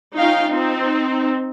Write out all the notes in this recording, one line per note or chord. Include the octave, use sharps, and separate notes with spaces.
C#4 D#4 F4 F5 G5
C4 D#4